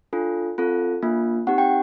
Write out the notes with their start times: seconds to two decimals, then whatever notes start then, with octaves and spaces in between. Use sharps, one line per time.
0.13 D4 F4 A4
0.58 C4 F4 A4
1.03 A#3 D4 F4
1.47 C4 D#4 G4 F#5
1.58 G5